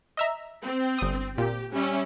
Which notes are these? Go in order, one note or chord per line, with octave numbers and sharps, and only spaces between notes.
D#5 E5 A#5
C4
G1 D#6
A#2 G4
G3 C#4 E5